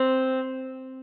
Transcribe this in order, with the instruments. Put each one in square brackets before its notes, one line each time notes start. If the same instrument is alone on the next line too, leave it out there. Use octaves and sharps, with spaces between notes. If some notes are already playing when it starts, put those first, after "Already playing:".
Already playing: [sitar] C4